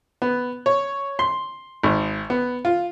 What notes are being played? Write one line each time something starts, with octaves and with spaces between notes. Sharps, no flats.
B3
C#5
C6
G#1
B3
F4